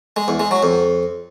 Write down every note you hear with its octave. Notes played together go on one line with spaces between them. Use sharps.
G#3
E2
G#3
F#3
F2